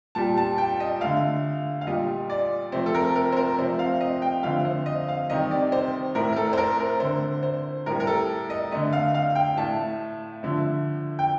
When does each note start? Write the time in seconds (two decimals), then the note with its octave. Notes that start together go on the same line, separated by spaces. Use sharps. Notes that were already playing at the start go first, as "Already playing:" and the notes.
0.15 A#2 G3 A5
0.37 A5
0.58 G5
0.80 D#5
1.01 D3 A3 F5
1.81 F5
1.87 A#2 G3 D#5
2.30 D5
2.72 C3 F3 A3 C5
2.86 A4
2.94 A#4
3.16 A#4
3.32 C5
3.37 A#4
3.58 C3 F3 A3 C5
3.79 F5
4.01 D#5
4.22 G5
4.43 D3 F3 A3 F5
4.65 C5
4.86 D#5
5.09 F5
5.30 C3 D#3 G3 D#5
5.51 D5
5.72 C5
6.15 A2 A3 A#4
6.32 A#4
6.36 A4
6.53 C5
6.58 A#4
6.80 A#4
7.00 D3 A3 C5
7.43 C5
7.86 A2 G3 A#4
8.00 A#4
8.07 A4
8.50 D#5
8.72 D3 A3 D#5
8.93 F5
9.14 F5
9.35 G5
9.57 A2 A3 A5
10.43 D3 F3 A3
11.19 G5